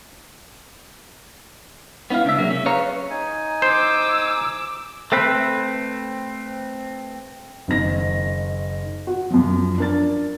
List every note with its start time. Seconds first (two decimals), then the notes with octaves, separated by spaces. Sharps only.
2.10 B3 C#4 D4 E4 F5
2.25 C#2 D4 E5
2.39 C3 F#3 A#3 G#4
2.50 C#4
2.66 G#4 B4 C#5 F5 A#5
3.10 D#4 G#5
3.62 C5 D6 E6
5.12 A3 C4 B4
7.68 F#1 D#3 A#6
9.07 F#4
9.30 F#2 F3
9.78 D4 A#4 A6